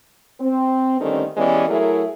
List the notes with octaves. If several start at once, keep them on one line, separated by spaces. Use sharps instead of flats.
C4
D3 D#3 G3 A3 C4 C#4
E3 G#3 B3 C#4 G4 D5
F#3 A3 E4 G#4 A#4